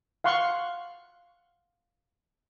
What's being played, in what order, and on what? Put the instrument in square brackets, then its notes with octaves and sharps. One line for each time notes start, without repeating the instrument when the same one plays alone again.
[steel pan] F5 F#5 C6 C#6